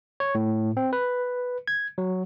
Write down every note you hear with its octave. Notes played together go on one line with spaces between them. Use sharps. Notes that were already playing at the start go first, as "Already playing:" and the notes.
C#5
A2
C4
B4
G#6
F#3